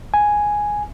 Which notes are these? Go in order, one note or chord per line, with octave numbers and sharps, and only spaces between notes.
G#5